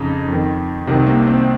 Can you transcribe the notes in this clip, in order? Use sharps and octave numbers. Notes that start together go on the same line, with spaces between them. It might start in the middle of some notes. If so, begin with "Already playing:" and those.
Already playing: F2 C#3 D#4
F2 D#3
C2 C3 D#3 C4
A#3
C4